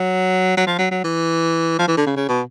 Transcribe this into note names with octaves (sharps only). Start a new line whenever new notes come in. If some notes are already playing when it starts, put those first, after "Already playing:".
Already playing: F#3
F#3
F3
F#3
F#3
E3
F3
E3
D3
C#3
C#3
B2